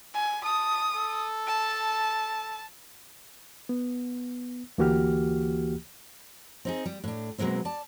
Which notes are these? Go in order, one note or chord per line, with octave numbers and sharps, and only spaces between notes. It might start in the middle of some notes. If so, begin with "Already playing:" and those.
G#5
A5 D#6
A4
A5
B3
D2 E3 A#3 F#4 G4 F6
C4 D#4 G#4
G3
A2 D4
B2 F#3 G#3 A#3 C4
D5 A5